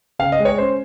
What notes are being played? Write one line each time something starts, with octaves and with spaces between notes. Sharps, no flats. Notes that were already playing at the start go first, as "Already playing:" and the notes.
C#3 F5
D#5
G#3
C#5
C#4 C5